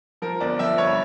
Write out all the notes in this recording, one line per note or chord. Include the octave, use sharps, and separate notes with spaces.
F3 A#4
G1 D5
F3 E5
G2 C#5